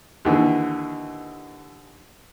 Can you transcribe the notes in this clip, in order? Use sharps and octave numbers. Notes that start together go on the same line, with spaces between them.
D#2 D3 E3